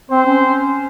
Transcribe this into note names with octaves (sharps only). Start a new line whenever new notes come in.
C4 C5
C#4